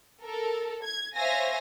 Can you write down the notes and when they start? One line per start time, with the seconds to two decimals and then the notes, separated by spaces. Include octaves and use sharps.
0.22 A4 A#4
0.85 G#6
1.15 C5 C#5 E5 F5 G#5 A#6